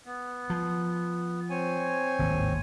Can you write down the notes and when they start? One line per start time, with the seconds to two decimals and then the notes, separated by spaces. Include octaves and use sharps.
0.06 B3
0.50 F3
1.50 C4 C#5 G#5
2.19 G#1 D#2 A2